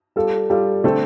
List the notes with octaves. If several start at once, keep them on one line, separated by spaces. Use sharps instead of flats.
G3 F4 A4
G3 F4 A4
D3 A3 C4 A4